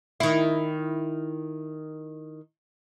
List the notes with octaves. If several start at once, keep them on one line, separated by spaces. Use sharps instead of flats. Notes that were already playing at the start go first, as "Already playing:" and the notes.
D#3 E4